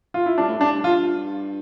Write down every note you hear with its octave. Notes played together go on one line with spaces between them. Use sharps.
F4
E4
G2 D4
A2
G2 D4
F4